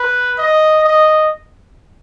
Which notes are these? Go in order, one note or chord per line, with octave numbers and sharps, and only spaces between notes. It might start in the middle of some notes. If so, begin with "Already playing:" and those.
Already playing: B4
D#5
D#5